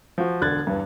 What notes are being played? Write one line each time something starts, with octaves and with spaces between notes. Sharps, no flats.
F3 F#4
E1 D3 F#6 G#6 A6
E2 G2